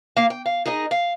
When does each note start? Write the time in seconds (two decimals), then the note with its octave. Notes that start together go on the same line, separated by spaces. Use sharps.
0.17 A#3 F5
0.30 G5
0.46 F5
0.66 D#4 G#4 A#4 D#5
0.91 F5